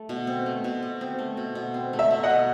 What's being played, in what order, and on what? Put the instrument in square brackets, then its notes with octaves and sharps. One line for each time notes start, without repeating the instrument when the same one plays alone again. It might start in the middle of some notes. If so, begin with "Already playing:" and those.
Already playing: [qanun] A3
B2
C4
A3
B2
B2
C4
A3
B2
B2
C4
A3
[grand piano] E5
[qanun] B2
[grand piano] D#5 F#5
[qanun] B2